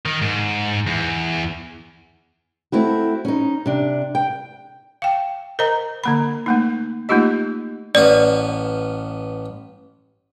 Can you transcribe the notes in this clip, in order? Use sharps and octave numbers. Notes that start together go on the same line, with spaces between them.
D#3
G#2
E2
A3 C4 E4 F#4
C#4 D#4
C3 D4
G5
F5 G5
A#4 C5 D#5 A#5
D3 A#3 B5
A3 A#3 D#4
A3 A#3 D#4 F4 G4 D#5
A1 B3 D5 F5